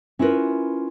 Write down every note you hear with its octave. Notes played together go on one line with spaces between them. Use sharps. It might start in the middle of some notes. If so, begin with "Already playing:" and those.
C#4 E4 F4 A#4 B4